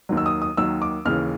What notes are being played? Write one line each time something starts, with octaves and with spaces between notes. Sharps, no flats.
D#2 D#3 F#3
E6
D#6
D#6
D#2 D#3 F#3 E6
D6
D#2 C#3 E3 F6